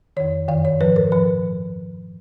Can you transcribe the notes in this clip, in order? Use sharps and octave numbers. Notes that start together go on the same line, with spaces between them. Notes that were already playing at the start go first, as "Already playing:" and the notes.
F2 D#3 C#5
F#2 D#3 F5
C#5
G#2 F3 B4
A#4
A#2 F3 B4